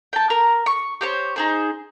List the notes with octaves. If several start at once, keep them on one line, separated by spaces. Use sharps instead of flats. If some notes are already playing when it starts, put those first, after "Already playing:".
G5 A5
A#4
C#6
G4 C5 C#5
D#4 G#4 C5